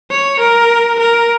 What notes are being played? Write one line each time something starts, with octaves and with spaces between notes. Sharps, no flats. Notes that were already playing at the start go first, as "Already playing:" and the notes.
C#5
A#4
A#4